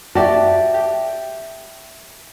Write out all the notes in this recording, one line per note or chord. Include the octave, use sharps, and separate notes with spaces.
F#4 G4 D5 E5 A5
G4